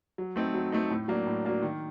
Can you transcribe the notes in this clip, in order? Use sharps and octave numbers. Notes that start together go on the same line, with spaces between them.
F#3
A3 C4 D#4
F#3
A3 C4 D#4
A2
F#3 A#3 D4
A2
F#3 A#3 D4
D#3